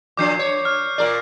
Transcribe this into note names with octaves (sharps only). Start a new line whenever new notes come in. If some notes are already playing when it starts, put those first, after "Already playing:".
A#2 F3 D4 D6 G6 C7
C#5
F6
A#2 A#4 D5